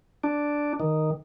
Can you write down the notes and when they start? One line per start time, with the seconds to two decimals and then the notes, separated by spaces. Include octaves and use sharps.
0.24 D4
0.80 D#3